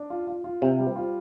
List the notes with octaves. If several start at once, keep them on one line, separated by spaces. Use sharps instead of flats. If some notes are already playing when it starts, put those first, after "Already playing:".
Already playing: D4
F4
F4
F4
C3 C4
G3
F4